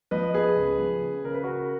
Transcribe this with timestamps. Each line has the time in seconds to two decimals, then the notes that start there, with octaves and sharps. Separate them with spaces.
0.11 F3 B4 D#5
0.34 B3 G#4 B4
0.56 C#2
0.79 F3
1.02 C#3
1.24 C#3 A#4
1.34 B4
1.43 C#3 F#4 A#4